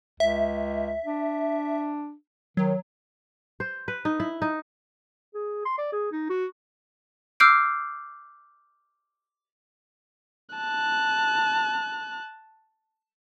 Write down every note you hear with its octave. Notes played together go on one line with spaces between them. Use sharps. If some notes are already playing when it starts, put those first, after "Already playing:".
C#2 E5
D4
D#3 F#3
C5
B4
D#4
E4
D#4
G#4
C6
D5
G#4
D#4
F#4
D6 E6 F6 G6 C7 D7
A5 F#6